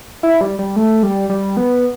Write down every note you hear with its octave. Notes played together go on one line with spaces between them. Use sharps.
E4
G3
G3
A3
G3
G3
B3